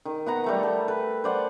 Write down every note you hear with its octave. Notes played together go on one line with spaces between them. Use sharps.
D#3
B3 F#5 A#5
G3 A3 A#5
A4
B4
C5 D5 F#5